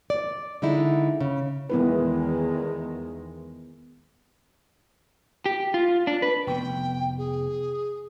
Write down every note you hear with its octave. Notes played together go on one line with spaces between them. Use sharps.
D5
D3 G#3 D#4 E4
C#3
E2 D#3 G#3 B3 E4 B4
G4
F4
D4
B4
F1 B3 G5
G#4